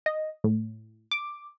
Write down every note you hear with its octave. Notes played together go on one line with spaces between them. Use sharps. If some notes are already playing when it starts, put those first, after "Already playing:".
D#5
A2
D6